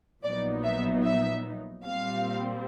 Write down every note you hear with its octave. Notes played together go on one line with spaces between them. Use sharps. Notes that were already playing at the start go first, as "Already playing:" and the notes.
A#1 A#2 F#3 B3 D#4 D5
E5
E5
A#2 G3 C4 F5